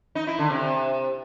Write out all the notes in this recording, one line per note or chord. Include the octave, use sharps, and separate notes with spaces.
D#4
E4
D3
C3